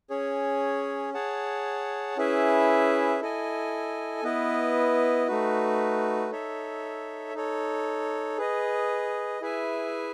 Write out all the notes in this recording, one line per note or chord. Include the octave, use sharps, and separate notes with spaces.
C#4 G#4 C#5
G#4 C#5 F#5 A5
C#4 E4 G#4 B4 E5
E4 A4 D#5 G#5
B3 E4 B4 D#5
A3 D#4 F#4 B4
D#4 A4 C#5 E5
D#4 A4 C#5
G#4 B4 D#5
E4 G#4 B4 E5 G#5